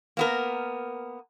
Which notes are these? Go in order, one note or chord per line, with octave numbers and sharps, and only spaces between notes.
A#3 B3 A#4